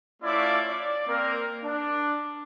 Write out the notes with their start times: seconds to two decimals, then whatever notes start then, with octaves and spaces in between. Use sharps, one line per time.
0.22 A3 C#4 E4 F4 D5 D6
0.69 D5
1.08 A#3 C4 A#4
1.63 D4